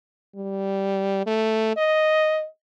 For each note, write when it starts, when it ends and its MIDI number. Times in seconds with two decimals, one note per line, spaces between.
0.36 1.22 55
1.27 1.75 57
1.77 2.46 75